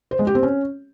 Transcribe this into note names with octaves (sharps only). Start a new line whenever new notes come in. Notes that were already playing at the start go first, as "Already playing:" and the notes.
C5
G#3
G4
C4
C#4